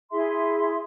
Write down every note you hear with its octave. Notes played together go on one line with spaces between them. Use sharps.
E4 G#4 E5 C6